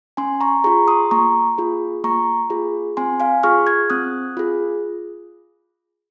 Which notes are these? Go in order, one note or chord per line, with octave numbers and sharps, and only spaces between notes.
C#4 G#5 C6
A#5 C#6
F4 G#4 A#5 C#6
C6 D#6
A#3 A#5 C#6
F4 G#4
A#3 A#5 C#6
F4 G#4
C4 G#5 C6
F5 G#5
F4 G#4 C#6 F6
F6 G#6
C4 D#6 F#6
F4 G#4